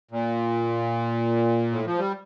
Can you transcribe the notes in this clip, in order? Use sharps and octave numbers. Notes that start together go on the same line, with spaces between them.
A#2
A2
F3
G3